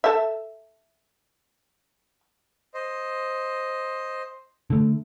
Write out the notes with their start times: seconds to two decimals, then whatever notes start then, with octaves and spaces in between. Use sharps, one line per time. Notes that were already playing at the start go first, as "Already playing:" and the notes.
0.04 A4 E5
2.74 C5 D#5
4.70 D3 A3